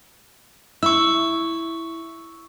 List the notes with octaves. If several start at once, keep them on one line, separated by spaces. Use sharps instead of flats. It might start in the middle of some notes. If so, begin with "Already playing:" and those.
E4 C#6 E6